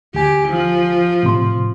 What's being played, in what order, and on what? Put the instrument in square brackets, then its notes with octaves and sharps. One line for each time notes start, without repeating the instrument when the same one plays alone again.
[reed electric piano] D2 G#5 [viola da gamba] G4
[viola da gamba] F3
[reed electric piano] A2 C3 C6